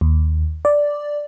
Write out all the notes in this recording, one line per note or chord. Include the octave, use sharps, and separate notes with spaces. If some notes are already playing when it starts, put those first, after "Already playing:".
D#2
D5